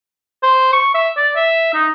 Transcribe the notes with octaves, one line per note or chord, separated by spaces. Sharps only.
C5
C#6
E5
D5
E5
D#4